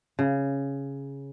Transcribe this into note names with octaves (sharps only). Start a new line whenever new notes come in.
C#3